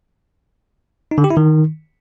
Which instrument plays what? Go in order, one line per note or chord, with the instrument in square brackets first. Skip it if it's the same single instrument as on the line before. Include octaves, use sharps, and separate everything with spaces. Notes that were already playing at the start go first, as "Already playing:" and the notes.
[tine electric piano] D#4
D3
G4
E4
D#3